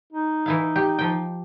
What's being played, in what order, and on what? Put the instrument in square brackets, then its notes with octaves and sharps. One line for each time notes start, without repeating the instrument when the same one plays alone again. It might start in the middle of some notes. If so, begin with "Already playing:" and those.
[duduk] D#4
[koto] E3 E4 F5
G4
F3 G5